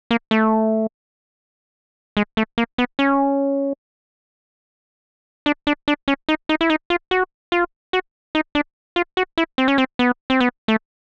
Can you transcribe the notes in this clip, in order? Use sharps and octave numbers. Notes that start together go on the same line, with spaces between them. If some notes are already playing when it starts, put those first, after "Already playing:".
A#3
A3
G#3
A3
A#3
B3
C#4
D4
D4
D4
C#4
D#4
D#4
E4
D#4
F4
F#4
F4
F#4
D#4
D4
F4
F#4
E4
C4
C#4
C4
B3
C4
B3
A3